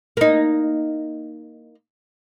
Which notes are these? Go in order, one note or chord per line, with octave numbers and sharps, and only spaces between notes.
A#3 D#4